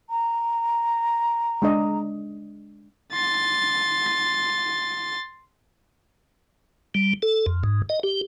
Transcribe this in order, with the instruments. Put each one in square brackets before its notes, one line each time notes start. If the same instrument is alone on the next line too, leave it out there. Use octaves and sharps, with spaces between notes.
[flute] A#5
[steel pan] G#3 D4 D#5
[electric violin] C6 A6
[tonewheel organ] G3
A4
F2
G#2
D#5
G4